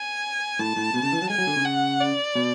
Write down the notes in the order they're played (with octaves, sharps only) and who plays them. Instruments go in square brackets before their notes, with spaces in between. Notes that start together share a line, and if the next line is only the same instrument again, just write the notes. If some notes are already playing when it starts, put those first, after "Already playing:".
Already playing: [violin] G#5
[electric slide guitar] A2 [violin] A5
[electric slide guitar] A2
B2
C#3
E3
F#3
[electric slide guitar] G#3 [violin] G#5
[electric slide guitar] F#3
D3
C#3
[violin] F#5
D5
[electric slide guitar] B2